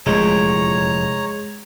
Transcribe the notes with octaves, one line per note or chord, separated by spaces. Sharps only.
F1 E2 A#2 G#3 C#5 A#5